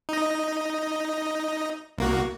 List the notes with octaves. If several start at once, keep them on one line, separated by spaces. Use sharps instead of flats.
D#4 D#5
C2 A#3 F#4